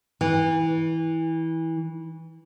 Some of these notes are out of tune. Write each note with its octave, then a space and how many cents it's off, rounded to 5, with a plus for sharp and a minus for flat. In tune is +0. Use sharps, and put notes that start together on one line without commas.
E3 -20